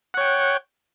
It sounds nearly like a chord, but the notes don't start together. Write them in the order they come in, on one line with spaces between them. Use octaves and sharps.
F#5 C#5 G5